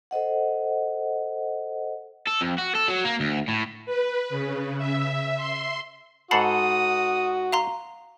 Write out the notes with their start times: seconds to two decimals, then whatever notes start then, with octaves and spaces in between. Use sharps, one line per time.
0.11 A4 C5 D#5 F#5
2.27 A4
2.41 F2
2.58 F#4
2.75 A4
2.88 F#3
3.05 A#3
3.20 D2
3.48 A2
3.86 B4
4.30 C#3
4.77 E5
5.37 C6
6.31 G#2 F#4 A4 F#5 A5 B5 D#6 C7
7.52 F5 A#5 C6